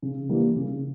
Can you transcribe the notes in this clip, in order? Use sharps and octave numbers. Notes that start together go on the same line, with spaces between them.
C#3
E3 G3 A#3
C#3